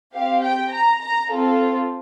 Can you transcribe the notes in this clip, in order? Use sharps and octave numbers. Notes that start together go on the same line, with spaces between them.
C4 G4 F5
G5
A#5
A#5
C4 F4 A4